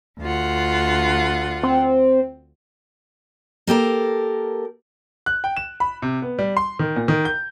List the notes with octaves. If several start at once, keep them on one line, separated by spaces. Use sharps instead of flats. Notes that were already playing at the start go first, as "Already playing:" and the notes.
D2 F4 F#5
C4
A#3 G4 A4 A#4
F#6
G5
E7
B5
C3
B3
G3
C6
D#3
A#2
D#3
G6